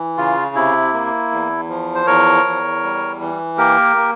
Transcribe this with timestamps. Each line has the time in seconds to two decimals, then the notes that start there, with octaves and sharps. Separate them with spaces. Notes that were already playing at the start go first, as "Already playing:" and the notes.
Already playing: E3
0.17 C#3 F4
0.55 C3 E4
0.93 A#3
1.32 E2
1.69 F3
1.95 C5
2.07 E2 A#4 C#5
2.44 E2
2.83 G3
3.21 E3
3.58 A#3 G4 A#4
3.96 A#3